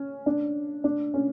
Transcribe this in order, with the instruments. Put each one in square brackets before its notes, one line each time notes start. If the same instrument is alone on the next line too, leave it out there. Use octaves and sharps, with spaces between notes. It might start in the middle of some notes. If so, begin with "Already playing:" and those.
Already playing: [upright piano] C#4
D4
D4
C#4